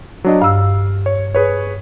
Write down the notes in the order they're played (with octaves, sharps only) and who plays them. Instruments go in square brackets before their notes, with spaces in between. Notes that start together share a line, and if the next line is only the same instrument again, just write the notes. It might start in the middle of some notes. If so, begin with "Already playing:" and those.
[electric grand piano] F#3 D4 D#5
[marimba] G2 E6 [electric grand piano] F5
[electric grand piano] C#5
G#4 B4 C#5